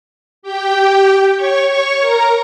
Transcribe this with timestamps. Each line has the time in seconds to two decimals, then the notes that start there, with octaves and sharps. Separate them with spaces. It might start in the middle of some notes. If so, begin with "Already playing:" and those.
0.43 G4 G5
1.37 C#5 C#6
1.68 C#5 C#6
2.00 A#4 A#5